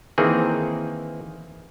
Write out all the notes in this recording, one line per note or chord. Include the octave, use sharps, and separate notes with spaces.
D#3 E3 A#3 C4 G#4